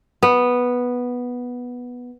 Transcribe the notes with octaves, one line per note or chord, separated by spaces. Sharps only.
B3